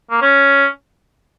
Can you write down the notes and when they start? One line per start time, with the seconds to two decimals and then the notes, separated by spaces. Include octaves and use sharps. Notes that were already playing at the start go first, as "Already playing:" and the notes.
0.11 A#3
0.22 C#4